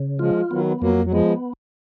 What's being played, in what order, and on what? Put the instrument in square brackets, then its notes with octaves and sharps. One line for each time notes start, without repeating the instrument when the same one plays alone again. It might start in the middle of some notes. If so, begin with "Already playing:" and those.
Already playing: [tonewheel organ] C#3
[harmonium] F3 G#3 [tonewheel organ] F4
[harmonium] D#3 F#3 [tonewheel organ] B3
[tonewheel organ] F2 [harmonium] F#3 A#3
[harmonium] F#3
[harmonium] F3 G#3 [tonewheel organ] B3